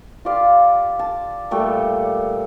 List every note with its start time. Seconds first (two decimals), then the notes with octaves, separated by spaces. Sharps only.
0.25 F4 G4 D5 F5
0.99 A5
1.51 A#2 G3 A3 G5